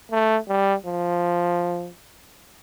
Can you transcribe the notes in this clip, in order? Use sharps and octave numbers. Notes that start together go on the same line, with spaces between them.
A3
G3
F3